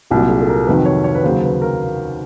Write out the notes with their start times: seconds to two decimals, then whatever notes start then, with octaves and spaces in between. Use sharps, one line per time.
0.10 C2 A#2 F#3 G4
0.29 G#4
0.41 A4
0.49 A#4
0.67 F2 C3 D#3 F#3 B4
0.86 C#5
1.04 C#5
1.15 B4
1.24 D#2 C#3 F#3 C5
1.43 B4
1.62 A#4